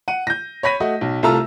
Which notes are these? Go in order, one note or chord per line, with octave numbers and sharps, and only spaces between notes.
F#5 D#7
G6 A#6
C#5 B5 A#6 B6 D#7
A3 F#4 D#5
B1
C2 A3 F4 A5 A#5 E6